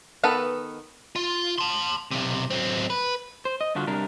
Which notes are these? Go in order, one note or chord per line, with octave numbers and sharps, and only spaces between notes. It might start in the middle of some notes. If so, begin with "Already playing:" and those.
D#3 B3 A4 B4
F4
A5 C6
B1 C3
F#3 C4
B4
C5
D#5
G2 D3 F4 F#4
C3 G3 D4 A#4